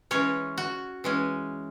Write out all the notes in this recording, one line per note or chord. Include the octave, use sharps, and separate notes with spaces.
E3 G#3 C#4 C#5
F#4
E3 G#3 C#4